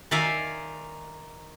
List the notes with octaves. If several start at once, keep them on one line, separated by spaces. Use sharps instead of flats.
D#3 D5 E5 F5 G#5 A#5